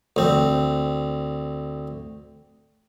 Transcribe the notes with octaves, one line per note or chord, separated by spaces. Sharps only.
D2 C4